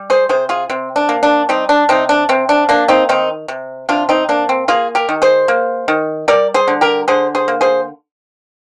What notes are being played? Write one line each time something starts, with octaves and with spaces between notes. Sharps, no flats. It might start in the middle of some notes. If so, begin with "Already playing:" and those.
Already playing: G3
G#4 C5
C3 G#4 C5
F4 G#4
C3 C4
D4
A#3
D4
G3 C4 D#4
D4
C3 C4 D#4
D4
C3 C4
D4
A#3 D4
C4 D#4
D#3 C4 D#4
C3
C3 D4 F4
C4 D#4
A#3 D4
C4
A#3 F4 G#4
G4 A#4
D#3
G#4 C5
A#3
D#3
G3 A#4 D5
G#4 C5
D3
G4 A#4
D3 G#4 C5
G#4 C5
A#3
G#4 C5